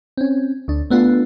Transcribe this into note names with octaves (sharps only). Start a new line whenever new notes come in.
C4 C#4
D2 D4
A3 B3 D4 F4